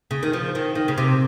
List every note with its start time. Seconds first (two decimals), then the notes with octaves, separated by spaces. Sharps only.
0.11 C#3
0.23 D#3
0.33 F3
0.55 D#3
0.75 D#3
0.88 C#3
0.97 C3